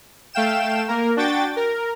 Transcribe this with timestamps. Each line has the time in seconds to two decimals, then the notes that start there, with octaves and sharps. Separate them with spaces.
0.33 A3 F5 G5 E7
0.88 A#3 A#4
1.17 D4 F#4 G5 A6
1.56 A#4